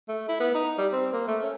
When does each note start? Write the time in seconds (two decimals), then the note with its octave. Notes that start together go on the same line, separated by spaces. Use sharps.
0.09 A3
0.29 E4
0.40 B3
0.55 D#4
0.78 G3
0.93 C4
1.13 A#3
1.28 A3
1.43 C#4